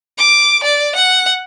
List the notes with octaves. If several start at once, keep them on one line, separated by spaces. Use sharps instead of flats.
D6
D5
F#5